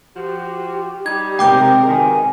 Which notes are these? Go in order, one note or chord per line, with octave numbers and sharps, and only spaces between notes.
F3 F#4 G4
G3 D#4 G#6
C3 G#3 A#4 G5 D6 G6
B2 D#3 G#5